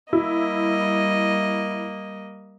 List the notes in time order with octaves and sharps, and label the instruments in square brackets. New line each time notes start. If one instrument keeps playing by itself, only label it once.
[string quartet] G3 A#3 D#5 [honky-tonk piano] E4